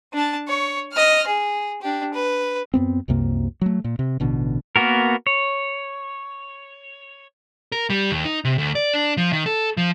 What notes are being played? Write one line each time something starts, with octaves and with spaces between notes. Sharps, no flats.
D4 A5
C#5 C#6
D#5 F6
G#4
D4 G4
B4
F#2 B3 C4
C2 F#2 C3 A#3
F#3 A3
A#2
C3
A1 B2 D3
A#3 B3 F#4 A#4
C#5
A#4
G3
D#2
D#4
C3
D2
D5
D4
F3
D#3
A4
F3